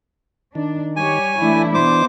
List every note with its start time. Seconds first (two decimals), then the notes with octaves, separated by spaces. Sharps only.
0.55 D#3 D4
0.96 G3 G4 C#5 G#5
1.42 E3 A3 D4 E4
1.74 B2 C5 D6